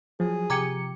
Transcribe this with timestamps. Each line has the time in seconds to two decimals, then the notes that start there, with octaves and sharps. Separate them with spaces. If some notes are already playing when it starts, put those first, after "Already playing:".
0.20 F3 F#3 G#4
0.50 C3 G4 A#5 D6 G#6 C#7